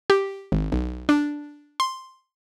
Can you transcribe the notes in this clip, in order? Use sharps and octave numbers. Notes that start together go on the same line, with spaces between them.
G4
G#1
B1
D4
C6